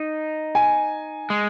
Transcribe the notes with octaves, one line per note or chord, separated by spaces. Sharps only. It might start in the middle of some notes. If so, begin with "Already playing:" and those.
Already playing: D#4
G#5
G#3